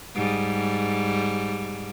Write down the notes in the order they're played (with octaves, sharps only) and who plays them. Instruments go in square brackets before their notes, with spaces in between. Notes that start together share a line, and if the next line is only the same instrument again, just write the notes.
[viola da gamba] G#2 G3